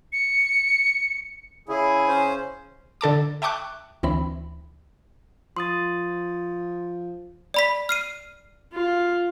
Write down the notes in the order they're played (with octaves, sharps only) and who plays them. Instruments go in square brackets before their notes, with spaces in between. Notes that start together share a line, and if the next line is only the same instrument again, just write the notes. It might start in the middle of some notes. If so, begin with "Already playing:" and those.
[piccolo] C#7
[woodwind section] C#3 G#4 [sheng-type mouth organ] E4
[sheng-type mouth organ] C#4 C5
[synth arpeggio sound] D3 A4 A5 D6
E5 G5 A5 C#6 D6 F#6
D2 E3 C4 B5
[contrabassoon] F3 [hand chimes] C6 D#6 A6
[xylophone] D5 B5 B6
F6 C7 D#7
[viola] F4